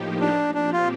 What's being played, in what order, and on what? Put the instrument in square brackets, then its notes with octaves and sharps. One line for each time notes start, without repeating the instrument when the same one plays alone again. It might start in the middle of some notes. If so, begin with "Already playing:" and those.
Already playing: [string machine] A2 F3 A#3 D#4 G4
[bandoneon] D4
[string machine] A#2 F3 C4 G4 [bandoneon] D4
[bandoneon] F4